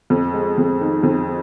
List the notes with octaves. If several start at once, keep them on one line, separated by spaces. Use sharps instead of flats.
F2
G#3
F2
D#3
F2